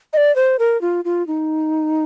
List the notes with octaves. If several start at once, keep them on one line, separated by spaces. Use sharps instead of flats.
D#5
D5
C5
A#4
F4
F4
D#4